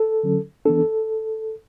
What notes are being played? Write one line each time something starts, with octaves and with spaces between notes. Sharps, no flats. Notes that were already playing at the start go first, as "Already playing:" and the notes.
Already playing: A4
D3 F#3 C#4
E3 B3 D4 A4